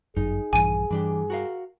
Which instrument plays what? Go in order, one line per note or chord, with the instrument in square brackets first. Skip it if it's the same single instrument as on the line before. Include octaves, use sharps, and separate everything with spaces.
[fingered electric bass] G1 F#2 [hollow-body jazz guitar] D#4 [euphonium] G#4
[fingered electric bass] A#1 G2 E3 [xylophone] G#5 D#7
[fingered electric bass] G2 [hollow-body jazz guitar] E3 D4 G4
[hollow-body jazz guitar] F#4 A#4 F5